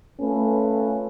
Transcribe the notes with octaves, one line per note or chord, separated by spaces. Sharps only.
A3 C#4 F4 A4 B4